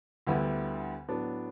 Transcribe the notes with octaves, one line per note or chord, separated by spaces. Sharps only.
D2 D3 G3 B3 E4
A2 F#3 B3 D4